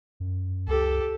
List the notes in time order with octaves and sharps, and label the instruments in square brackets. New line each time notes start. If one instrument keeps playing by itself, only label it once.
[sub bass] F#2
[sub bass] C#2 [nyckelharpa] G4 A4